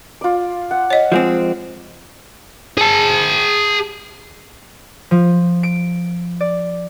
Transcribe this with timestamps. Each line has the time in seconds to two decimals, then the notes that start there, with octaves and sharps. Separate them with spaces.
0.21 F4 D5
0.71 F#5
0.90 C#5 D#5
1.12 F3 G#3 C4
2.78 G#4 A5
5.11 F3
5.63 D7
6.40 D5